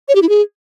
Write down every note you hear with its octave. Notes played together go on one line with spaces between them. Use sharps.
C#5
G4
E4
G#4